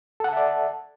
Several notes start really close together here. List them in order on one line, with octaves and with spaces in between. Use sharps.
A4 F#5 A5 E5 D5